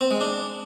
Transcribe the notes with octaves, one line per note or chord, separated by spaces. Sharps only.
C4
G#3
D4